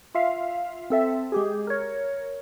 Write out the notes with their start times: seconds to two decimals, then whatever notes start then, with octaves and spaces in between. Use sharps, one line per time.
0.15 F4 E5 F5
0.90 C4 A4 E5
1.32 G#3 G4 G#4
1.67 A#4 C#5